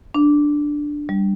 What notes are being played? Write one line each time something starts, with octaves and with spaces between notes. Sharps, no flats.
D4
G3